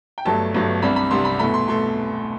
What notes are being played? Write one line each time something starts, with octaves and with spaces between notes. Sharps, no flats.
G5
G1 G2 F#3 A3 A5
G1 G2 F#3 A3
C2 C3 G3 D4 B5
B5
C2 C3 G3 D4 C6
B5
E2 B2 A3 B5
C6
B2 A3 C6